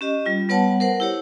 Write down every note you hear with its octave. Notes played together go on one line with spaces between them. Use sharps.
C#4 G4 D#5
G3 F4
G3 B3 B4 C#5 F#5 A5
A#4 C5 F#5
E4 G4 C#5